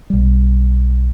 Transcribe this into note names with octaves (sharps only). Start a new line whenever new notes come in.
B1 G3